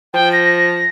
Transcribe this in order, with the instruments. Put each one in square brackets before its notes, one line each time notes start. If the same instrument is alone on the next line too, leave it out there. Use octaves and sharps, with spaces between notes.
[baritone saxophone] F3 [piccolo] G5
[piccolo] A#6